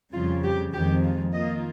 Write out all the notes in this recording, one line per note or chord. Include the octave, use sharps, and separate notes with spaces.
F2 C#3 G3 F4
G4
F2 D#3 G#3 G4
F4
D#3 A#3 F4 D#5